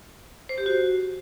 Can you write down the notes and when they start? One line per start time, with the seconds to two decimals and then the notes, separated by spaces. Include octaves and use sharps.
0.49 C5
0.58 G4
0.66 F#4